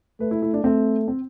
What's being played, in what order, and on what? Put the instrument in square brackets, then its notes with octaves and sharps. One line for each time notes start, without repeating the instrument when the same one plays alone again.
[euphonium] A3 [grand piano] B4
[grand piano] E4
E4
D4
[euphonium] A3 [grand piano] C4
[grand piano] C4